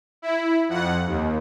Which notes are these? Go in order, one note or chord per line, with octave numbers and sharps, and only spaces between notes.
E4
F2 F#5
D#2